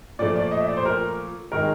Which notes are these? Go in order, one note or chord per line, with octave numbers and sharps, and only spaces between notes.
A#2 F3 A3 D5
D5
D#5
E5
D5
C5
A#4
D#3 G#3 A#4